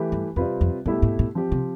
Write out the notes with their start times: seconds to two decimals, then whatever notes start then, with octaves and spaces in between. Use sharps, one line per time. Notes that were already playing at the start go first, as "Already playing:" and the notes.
Already playing: E3 A3 E4 G4 B4
0.12 G2
0.36 F2 C3 G3 C4 F4 B4
0.61 F2
0.85 G2 B2 A3 E4 G4
1.02 A2
1.19 A2
1.35 F3 C4 G4
1.52 C3